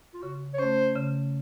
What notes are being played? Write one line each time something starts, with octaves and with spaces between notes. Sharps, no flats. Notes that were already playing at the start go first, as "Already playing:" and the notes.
F4
C#3 F#4
C#5
A3 C#4 C5
C#3